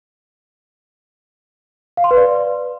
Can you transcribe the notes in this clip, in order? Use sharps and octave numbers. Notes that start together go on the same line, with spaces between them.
F5
C6
B4
D5